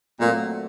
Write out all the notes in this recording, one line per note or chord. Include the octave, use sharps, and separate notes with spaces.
A#2 F#3 A3 C4 F#4